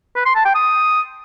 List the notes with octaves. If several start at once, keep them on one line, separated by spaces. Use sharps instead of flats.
B4
C6
A5
G5
D#6